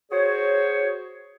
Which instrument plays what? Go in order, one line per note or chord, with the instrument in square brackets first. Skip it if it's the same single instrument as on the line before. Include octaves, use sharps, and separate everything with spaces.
[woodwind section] F#4 G#4 C5 C#5